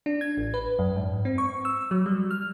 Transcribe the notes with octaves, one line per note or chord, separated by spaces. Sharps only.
D4
G#6
A1
B4
F#2
G#2
C4
C#6
E6
F#3
G3
F6